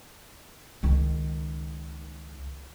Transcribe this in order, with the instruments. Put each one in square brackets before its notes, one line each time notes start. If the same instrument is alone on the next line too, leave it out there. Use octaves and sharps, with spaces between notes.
[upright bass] C#2 D#3